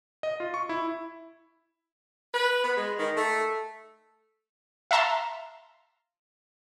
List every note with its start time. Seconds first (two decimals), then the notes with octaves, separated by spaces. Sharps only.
0.23 D#5
0.40 F4
0.54 C#6
0.69 E4
2.34 B4
2.63 B3
2.76 G#3
2.98 D#3
3.17 A3
4.91 E5 F5 A5 A#5 C6